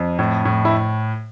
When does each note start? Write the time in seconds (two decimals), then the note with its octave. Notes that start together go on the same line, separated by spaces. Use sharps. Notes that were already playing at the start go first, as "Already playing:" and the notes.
Already playing: F2
0.19 A2
0.45 A2
0.65 E4